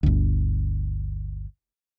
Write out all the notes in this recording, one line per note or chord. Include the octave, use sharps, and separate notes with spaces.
G1 D2